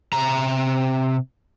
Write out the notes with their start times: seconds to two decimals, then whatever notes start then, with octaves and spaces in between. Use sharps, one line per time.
0.12 C3 A#5